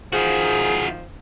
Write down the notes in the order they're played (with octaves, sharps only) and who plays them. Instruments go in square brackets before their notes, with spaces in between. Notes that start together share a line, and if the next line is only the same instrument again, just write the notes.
[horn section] D#3 F3 [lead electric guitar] E4 F#4 [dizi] G#4